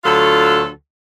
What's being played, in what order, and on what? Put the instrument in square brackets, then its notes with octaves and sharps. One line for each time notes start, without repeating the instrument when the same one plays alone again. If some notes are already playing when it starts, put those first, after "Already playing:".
[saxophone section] D2 F#3 F4 A4